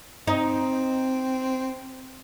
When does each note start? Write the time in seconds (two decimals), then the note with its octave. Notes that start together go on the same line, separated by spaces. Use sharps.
0.27 C4 D#4